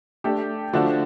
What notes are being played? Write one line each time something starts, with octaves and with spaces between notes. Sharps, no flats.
A3 D4 G4
D3 F3 A3 D4 F#4